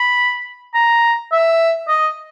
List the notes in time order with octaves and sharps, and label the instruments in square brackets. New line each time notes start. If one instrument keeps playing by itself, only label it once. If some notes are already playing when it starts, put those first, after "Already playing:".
Already playing: [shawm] B5
A#5
E5
D#5